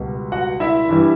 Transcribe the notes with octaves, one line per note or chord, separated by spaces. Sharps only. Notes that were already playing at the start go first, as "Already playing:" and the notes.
Already playing: C#2 B2 G3
F#4 F#5
E4 E5
G2 E3 G3